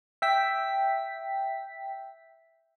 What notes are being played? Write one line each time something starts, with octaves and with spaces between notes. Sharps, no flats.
E5 G5 B6